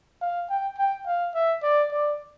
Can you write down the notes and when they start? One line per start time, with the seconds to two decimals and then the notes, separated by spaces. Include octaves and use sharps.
0.22 F5
0.50 G5
0.78 G5
1.07 F5
1.35 E5
1.63 D5
1.91 D5